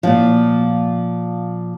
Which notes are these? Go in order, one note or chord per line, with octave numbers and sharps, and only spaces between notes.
A#2 F3